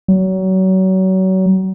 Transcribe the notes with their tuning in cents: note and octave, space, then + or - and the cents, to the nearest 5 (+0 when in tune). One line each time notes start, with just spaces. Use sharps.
F#3 +30